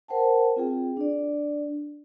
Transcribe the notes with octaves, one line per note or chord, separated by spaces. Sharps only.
A#4 C5 F#5 G5 A5
C4 F4 G#4 G5
D4 D5